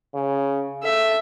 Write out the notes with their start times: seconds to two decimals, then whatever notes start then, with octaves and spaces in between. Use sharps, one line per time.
0.14 C#3
0.83 A4 E5